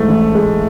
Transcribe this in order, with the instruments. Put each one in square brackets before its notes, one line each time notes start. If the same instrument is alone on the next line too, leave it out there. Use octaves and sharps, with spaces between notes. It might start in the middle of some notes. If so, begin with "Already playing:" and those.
Already playing: [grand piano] G#2 E3 [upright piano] A3
[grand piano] A1
G#3